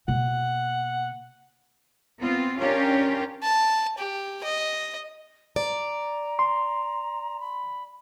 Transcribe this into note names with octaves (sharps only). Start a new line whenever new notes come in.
B2 A#3 F#5
B3 C4 F4
C#4 D4 F4 G4 A#4 C#5
A5
G4
D#5
D5 A#5
C6
B5